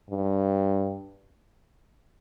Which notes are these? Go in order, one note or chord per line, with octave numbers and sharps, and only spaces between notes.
G2